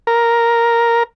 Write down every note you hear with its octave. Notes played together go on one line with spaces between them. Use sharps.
A#4